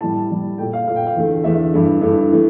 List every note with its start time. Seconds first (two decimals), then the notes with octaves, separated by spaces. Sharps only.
0.01 A2 G3 A5
0.30 A2 G3
0.58 A#2 A3 G5
0.73 F5
0.87 A#2 A3 F5
0.96 G5
1.06 F5
1.15 E2 D3 A3
1.44 E2 D3 A3 E5
1.74 G2 E3 A3
2.01 G2 E3 A3
2.31 E3 A3